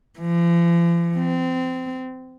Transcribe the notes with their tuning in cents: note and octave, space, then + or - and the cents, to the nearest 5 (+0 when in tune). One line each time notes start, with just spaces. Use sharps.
F3 -45
C4 -25